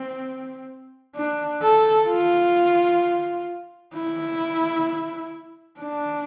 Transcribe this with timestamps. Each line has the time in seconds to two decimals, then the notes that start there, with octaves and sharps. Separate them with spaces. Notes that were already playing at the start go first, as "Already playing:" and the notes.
Already playing: C4
1.15 D4
1.62 A4
2.08 F4
3.94 E4
5.81 D4